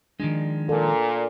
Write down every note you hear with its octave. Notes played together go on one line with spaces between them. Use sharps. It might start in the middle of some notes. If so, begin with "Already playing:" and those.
D#3 F3 G#3 D4
A#2 A4